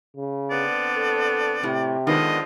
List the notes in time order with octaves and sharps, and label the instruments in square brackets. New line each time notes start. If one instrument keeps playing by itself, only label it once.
[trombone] C#3
[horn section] D3 B3 C4 [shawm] D5
[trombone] A4
[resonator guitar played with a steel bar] A2 [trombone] C3
[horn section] D3 F3 G#3 [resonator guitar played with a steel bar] D#3 B3 D4 [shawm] D#5